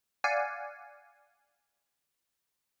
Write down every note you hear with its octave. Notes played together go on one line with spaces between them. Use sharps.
D5 F5 F#5 G#5